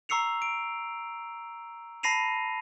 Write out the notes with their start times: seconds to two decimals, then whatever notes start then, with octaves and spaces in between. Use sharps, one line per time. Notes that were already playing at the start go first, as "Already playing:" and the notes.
0.09 A#5 C#6 E6 C7 C#7 F7
0.42 D7
2.03 A5 B5 A#6 C7 D#7 F7